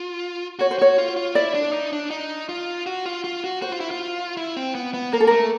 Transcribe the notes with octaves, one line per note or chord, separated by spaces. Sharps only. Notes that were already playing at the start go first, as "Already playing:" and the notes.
Already playing: F4
F#4 C#5
C5
F#4 C#5
F4
F4
E4 D5
D4
D#4
D4
D#4
F4
F#4
F4
F4
F#4
F#4 C5
F4
E4
F4
E4
C4
B3
B3
A#3 A#4
A4
A3 A#4